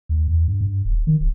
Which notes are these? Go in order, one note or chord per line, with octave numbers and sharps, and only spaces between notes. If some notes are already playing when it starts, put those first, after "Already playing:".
D#2
E2
G2
G2
D#1
D#3
D1